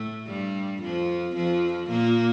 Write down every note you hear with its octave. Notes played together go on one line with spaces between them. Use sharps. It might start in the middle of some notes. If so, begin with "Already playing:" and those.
Already playing: A2 A3
G2 G3
F2 F3
F2 F3
A#2 A#3